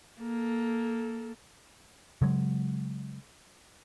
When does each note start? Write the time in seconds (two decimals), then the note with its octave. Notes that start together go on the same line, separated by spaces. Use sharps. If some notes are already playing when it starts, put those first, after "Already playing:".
0.20 A#3 A4
2.22 C#3 F#3 G#3